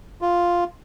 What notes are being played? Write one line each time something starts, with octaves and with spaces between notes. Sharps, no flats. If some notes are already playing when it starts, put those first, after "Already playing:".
F4